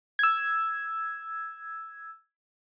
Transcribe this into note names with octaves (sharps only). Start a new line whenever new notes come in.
E6 G#6